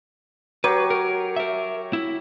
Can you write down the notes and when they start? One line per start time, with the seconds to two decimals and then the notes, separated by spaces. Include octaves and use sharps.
0.64 F#3 G4 B4 C#5
0.90 A#4
1.36 A#4 E5
1.93 E4